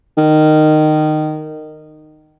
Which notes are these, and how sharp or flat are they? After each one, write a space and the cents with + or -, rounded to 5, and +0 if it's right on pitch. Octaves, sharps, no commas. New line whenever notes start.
D#3 -15